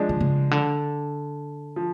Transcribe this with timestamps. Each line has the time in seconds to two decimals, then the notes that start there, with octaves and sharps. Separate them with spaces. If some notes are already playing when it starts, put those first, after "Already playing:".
Already playing: F3 G#3 D4
0.09 D3
0.21 C#3
0.51 D3
1.76 F3